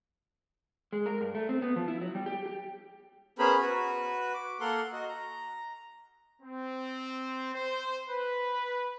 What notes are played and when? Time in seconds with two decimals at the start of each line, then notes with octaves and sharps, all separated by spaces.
0.93 G#3
1.06 A#4
1.21 G2
1.35 A3
1.49 C4
1.62 B3
1.76 F3
1.88 E4
2.01 F#3
2.15 G3
2.26 G4
2.46 G4
3.39 B3 C#4 G#4 A#4 C5 B5
3.61 F#4 B4
4.34 D6
4.61 A#3 A4 A#4 F#5 C6
4.93 F#4 D#5
5.08 A#5
6.42 C4
7.55 C5
8.10 B4